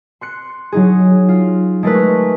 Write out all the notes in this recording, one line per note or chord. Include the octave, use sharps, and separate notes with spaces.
C6 F#6 C#7
F#3 D#4 G#4
F4
G#3 A3 A#4 B4
C#6